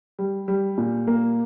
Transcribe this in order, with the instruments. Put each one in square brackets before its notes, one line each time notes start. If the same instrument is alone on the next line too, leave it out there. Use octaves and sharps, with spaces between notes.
[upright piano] G3
G3
A#2
A#3